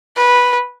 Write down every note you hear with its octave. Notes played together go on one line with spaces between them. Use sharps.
B4